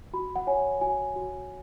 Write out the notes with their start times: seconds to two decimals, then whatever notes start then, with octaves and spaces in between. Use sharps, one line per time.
0.13 F#4 B5
0.36 F#5
0.47 C#5 G#5
0.81 F#4 G#5
1.16 F#4